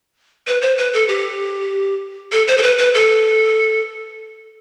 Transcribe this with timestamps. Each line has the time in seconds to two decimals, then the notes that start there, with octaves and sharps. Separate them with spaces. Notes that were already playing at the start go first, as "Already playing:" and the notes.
0.47 B4
0.61 C5
0.78 B4
0.94 A4
1.08 G4
2.32 A4
2.48 C5
2.58 A4
2.63 B4
2.78 B4
2.94 A4